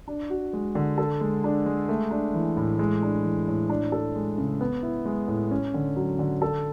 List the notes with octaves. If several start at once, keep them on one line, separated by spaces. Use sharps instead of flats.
D4
F#4
G#3
D3
A4
G#3
D4
G#3
A3
D4
E3
A2
G#3
D4
E3
A2
D4
A4
G#3
C#3
B3
E4
G#3
A2
C#4
D3
F#3
D3
A4